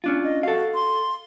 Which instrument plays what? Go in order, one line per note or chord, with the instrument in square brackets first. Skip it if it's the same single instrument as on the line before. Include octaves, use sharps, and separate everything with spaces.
[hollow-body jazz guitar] C#4 D4 F4
[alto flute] D#5
[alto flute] F#4 [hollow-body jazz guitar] A4 F5
[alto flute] C6